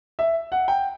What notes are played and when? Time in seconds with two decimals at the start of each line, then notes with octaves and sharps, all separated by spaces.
0.19 E5
0.52 F#5
0.68 G5